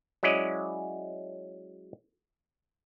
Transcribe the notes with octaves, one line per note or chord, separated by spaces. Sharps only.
F#3 G#3 C#4 E4 D5 D#5